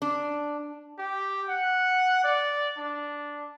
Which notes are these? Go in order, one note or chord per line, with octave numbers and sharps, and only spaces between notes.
D4
G4
F#5
D5
D4